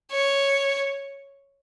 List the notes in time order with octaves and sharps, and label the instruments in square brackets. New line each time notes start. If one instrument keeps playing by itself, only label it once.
[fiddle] C#5